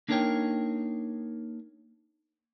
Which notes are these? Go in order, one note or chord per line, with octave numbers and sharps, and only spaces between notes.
A#3 D4 D#4 A#4 C#5 G5